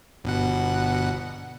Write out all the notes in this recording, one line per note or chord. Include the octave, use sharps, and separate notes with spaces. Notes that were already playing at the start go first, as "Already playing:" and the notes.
G1 B2 F#5